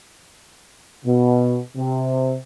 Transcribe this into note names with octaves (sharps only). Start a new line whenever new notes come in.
B2
C3